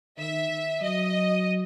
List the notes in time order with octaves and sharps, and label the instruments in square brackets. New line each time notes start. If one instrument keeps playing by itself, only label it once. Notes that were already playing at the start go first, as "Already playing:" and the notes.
[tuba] D#3 [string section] E5
[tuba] F#3 [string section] D#5